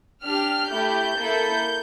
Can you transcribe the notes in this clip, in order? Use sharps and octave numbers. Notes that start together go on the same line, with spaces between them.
D4 G4 F6
A3 E4 G4 G6
A#3 E4 A4